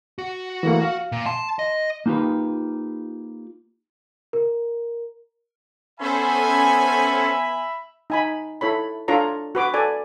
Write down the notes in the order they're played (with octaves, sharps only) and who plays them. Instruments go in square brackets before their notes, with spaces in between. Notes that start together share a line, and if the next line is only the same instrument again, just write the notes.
[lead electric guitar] F#4
[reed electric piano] E3 A3 A#3
F5
[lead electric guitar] A#2
[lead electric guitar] A5 [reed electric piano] C6
[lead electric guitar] D#5
[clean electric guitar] A#3 D#4 F4 G4 B4
[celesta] A#4
[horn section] B3 G#5 [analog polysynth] C#4 A4 C5 [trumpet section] E5 B5
[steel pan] D#4 G#5 B5
E4 A4 C#5 B5
D4 F4 A4 C#5 A#5
F#4 B4 D6
A4 D5 G#5